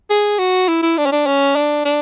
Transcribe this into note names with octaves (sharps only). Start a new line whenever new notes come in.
G#4
F#4
E4
E4
D4
C#4
D4
C#4
D4
D4